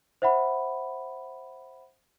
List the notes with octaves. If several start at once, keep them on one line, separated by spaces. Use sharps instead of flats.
C5 E5 F#5 B5